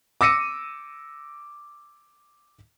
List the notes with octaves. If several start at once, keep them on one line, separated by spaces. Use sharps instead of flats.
D6 E6 A#6 C#7 D#7